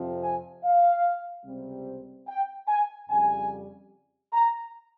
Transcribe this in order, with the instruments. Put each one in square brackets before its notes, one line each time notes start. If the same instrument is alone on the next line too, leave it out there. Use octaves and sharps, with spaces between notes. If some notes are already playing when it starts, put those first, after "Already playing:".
Already playing: [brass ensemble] F2 C3 F3 C4
G#5
F5
C#2 C3 G3 C4
G5
G#5
F2 C#3 G3 G#5
A#5